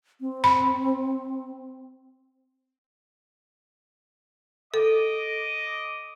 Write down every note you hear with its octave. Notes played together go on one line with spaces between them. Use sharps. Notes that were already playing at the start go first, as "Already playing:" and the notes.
C4
B5
A4 D#5 D6